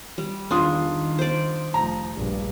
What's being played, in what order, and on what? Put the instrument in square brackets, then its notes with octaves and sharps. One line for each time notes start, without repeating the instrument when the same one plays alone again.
[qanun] G3
[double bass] E2 D#3 [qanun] D4 [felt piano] F4 C6 D#6
[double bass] D#3
[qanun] C5 D5
[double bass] F1 F3 [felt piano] A#5
[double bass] A#1 G2